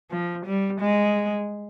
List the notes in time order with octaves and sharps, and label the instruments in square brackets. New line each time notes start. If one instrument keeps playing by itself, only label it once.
[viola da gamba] F3
G3
G#3